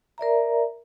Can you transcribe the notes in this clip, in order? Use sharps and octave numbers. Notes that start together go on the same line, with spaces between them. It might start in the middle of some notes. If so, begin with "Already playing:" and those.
A#4 D5 E5 A#5